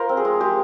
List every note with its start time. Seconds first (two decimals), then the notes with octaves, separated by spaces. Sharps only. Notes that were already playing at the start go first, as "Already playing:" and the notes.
Already playing: F4 A#4 C5
0.09 C4
0.17 G#4
0.25 G#3
0.41 G#3 G4